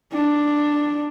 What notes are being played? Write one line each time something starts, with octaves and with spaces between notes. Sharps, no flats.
D4